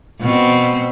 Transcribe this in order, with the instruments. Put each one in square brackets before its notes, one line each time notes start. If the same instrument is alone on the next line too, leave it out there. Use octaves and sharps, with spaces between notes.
[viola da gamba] B2 C4